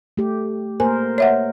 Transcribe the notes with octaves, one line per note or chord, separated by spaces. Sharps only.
A3 G4
A#3 A#4 C5 G#5
C#5 E5 F#5